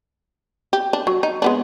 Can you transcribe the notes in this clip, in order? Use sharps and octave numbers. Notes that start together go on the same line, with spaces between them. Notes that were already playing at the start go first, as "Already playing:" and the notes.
G4
D4
F#3
D#4
G#3 B3 D4